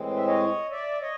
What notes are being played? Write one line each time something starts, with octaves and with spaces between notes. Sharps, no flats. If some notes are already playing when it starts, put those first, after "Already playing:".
Already playing: A2 E3 G#3 C4
E5
C#5 D#5
D5 E5
C#5 D#5